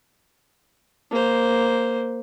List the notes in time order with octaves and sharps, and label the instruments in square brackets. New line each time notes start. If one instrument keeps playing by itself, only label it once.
[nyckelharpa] A#3 C5